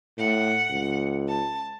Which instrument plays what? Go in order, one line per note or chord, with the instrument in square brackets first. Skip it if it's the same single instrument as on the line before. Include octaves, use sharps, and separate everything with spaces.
[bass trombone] A2 [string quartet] F#5
[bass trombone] C#2
[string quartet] A5